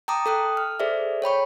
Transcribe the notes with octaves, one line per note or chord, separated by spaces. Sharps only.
G5 A5 A#5 D6 D#6
A4 G5 D#6 F#6
F6
G#4 A4 C5 D5 E5
C#5 G5 B5 C#6